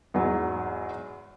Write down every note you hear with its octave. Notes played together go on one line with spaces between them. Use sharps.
E2 G#2 F#3